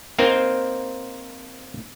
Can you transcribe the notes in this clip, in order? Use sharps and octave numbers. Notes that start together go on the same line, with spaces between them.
A#3 C4 D#4 A#4 C5